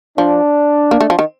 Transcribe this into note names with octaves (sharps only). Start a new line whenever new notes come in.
F3 D4
A#3
A3
F3
D#3